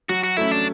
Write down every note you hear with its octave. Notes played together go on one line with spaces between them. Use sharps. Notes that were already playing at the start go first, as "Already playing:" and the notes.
F#3 F#4
F#4
A3 C#4 E4
D4